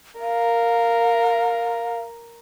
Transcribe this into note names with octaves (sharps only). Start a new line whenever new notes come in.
A#4 F5